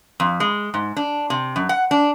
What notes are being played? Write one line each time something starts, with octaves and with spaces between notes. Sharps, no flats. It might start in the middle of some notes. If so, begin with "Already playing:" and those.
F2
G#3
G#2
D4
C3
F#2
F#5
D4